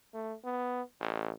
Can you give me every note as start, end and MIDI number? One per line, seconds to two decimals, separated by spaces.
0.14 0.34 57
0.44 0.82 59
1.00 1.31 33